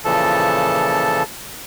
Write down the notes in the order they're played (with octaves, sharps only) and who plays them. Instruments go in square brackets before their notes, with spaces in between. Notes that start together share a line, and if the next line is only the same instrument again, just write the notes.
[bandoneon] A#2 C#3 E3 F3 A4 A5